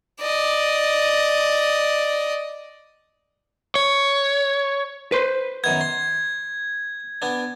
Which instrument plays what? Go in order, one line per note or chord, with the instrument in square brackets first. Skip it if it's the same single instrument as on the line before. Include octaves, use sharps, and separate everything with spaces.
[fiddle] D5 D#5
[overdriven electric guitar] C#5
[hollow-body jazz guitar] B4 C5
[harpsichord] F#2 D#3 B3 [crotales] G#6
[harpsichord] C6
B3 D4